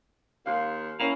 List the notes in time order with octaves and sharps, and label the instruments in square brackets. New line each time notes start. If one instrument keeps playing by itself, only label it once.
[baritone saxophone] D#2 [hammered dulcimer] F5 C6
[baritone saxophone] A#3 [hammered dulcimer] C#4 E4 C5